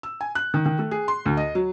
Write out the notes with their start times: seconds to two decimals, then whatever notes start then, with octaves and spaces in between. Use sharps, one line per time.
0.03 E6
0.21 G#5
0.35 F#6
0.54 D#3
0.66 D#3
0.79 A3
0.91 G#4
1.08 C6
1.26 D2
1.37 D#5
1.55 F#3